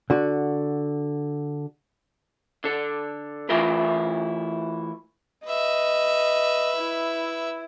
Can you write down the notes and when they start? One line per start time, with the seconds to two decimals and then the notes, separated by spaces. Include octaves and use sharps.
0.10 D3 F#4
2.64 D3 A4
3.49 E3 A3 E4 F4 A#4 B4
5.46 B4 D#5 E5
6.77 E4